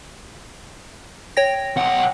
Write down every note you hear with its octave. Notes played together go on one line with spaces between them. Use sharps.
C#5 G5 A#6
B1 F#5